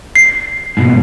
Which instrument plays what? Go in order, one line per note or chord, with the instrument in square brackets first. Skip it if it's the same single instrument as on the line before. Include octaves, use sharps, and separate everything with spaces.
[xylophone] C7
[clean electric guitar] G#2 B2